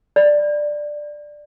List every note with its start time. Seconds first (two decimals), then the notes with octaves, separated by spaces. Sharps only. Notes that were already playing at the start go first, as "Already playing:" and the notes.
0.16 D5